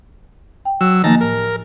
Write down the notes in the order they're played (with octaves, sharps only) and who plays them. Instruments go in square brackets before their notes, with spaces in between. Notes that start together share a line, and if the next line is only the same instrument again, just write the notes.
[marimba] G5
[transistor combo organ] F#3 E6
[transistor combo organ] D#3 A5 A#5 [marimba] F3 A#3
[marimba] A2 [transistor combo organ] A#4